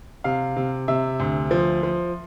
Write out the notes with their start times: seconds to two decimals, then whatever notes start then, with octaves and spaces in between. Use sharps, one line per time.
0.24 C3 F5
0.56 C3
0.88 C3 E5
1.20 D2
1.51 F3
1.83 F3